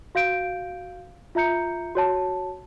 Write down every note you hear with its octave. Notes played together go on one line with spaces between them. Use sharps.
F#4 F5 G6 D7
F4 E5 A#5 G6 C#7
F#4 C#5 A5